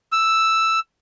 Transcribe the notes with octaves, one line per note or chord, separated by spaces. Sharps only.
E6